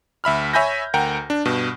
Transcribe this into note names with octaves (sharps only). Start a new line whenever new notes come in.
D2 E5 B5 F6
C#5 E5 G#5 B5 G6 A#6
D2 A#4 F#5 G5 A#5
D4
G2 B2